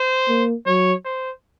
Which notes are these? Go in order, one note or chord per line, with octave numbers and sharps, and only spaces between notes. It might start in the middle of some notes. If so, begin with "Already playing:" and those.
Already playing: C5
A#3
F#3 C#5
C5